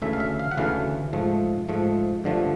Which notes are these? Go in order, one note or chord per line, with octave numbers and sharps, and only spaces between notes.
D2 C#3 E3 A3 E5
F5
E5
F5
F#5
D2 C#3 E3 A3 F5
G#2 F3 A3
G#2 F3 A3
G2 D3 F3 A3